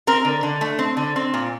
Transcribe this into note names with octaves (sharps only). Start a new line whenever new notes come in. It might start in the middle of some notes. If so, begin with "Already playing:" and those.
C4 A#4
D3
D3
A3
C4
D3
C4
A#2